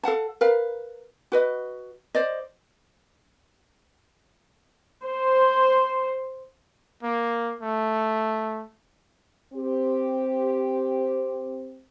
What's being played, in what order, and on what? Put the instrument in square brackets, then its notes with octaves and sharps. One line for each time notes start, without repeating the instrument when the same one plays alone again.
[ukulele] A4 F5 F#5 A5
A#4 B4 F5
F#4 B4 D#5
C5 D5 D#5
[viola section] C5
[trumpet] A#3
A3
[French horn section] C4 G4 C5